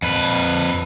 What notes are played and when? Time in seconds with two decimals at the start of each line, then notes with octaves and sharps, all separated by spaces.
0.02 F2 B4